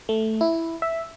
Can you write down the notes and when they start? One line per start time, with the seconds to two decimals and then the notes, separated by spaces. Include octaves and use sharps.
0.09 A3
0.41 E4
0.82 E5